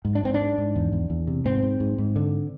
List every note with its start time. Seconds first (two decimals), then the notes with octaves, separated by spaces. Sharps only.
0.05 G#2
0.15 D4
0.23 G#2 C4
0.34 D4
0.41 G#2
0.58 G#2
0.76 E2
0.92 E2
1.10 E2
1.27 C3
1.45 G#2 C4
1.63 G#2
1.80 G#2
1.98 G#2
2.16 D3